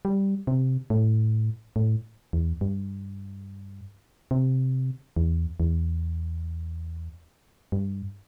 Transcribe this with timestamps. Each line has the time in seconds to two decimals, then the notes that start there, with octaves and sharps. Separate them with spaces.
0.05 G3
0.47 C3
0.90 A2
1.76 A2
2.33 E2
2.61 G2
4.31 C3
5.17 E2
5.60 E2
7.72 G2